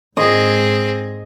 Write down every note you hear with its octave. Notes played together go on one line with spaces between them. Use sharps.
G#2 C4 G#4 D#5